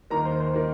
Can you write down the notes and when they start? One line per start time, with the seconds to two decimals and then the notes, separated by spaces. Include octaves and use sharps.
0.10 D#2 D#3 A#3 A#5
0.25 C5
0.40 C5
0.54 D#3 A#3